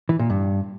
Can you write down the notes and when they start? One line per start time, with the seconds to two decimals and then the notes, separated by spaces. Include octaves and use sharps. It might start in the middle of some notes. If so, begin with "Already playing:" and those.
0.09 E3
0.19 A#2
0.30 G2